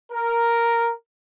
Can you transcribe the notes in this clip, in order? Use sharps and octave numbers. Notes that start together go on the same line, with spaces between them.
A#4